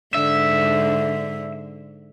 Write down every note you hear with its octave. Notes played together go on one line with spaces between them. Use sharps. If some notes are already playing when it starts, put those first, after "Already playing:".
G#2 D3 E5